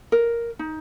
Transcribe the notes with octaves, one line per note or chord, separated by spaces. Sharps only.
A#4
D#4